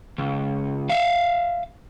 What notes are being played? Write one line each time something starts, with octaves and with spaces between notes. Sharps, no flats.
C#2
E5 F5